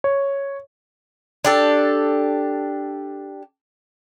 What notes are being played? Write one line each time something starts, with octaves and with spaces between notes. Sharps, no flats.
C#5
D4 G4 A4